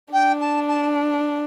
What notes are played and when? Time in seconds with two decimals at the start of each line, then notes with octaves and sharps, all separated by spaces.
0.13 D4 G5
0.40 A5
0.68 A5